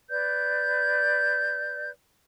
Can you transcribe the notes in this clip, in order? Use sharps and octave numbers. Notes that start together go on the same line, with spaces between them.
B4 D5 G6